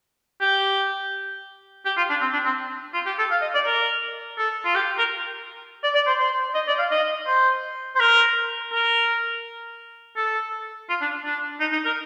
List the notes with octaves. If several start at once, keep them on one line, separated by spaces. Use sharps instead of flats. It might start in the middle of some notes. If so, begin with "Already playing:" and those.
G4
G4
F4
D4
C4
D4
C4
F4
G4
A4
F5
D#5
D5
A#4
A4
F4
G4
A#4
D5
D5
C5
C5
D#5
D5
F5
D#5
C5
C5
A#4
A#4
A4
F4
D4
D4
D#4
D#4
A#4